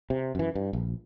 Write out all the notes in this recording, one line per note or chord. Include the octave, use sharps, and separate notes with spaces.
C3
F#2 E3
G2
A#1